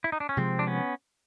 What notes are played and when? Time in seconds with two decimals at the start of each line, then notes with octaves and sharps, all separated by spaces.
0.04 E4
0.12 D#4
0.20 D4
0.29 C#4
0.37 C3 F3 G#3 C4
0.59 D4
0.67 B3 C#4